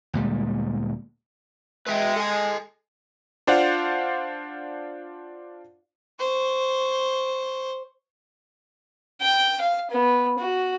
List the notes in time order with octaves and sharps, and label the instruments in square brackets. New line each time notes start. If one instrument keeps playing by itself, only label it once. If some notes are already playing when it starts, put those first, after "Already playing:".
[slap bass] D2 A#2 G3 G#3
[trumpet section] G#3 [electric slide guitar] B4 E5 G5
[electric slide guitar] A4 G#5
[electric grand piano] D4 F4 C5 D5 F5 F#5
[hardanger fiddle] C5 C#6
G5
F5
B3
F#4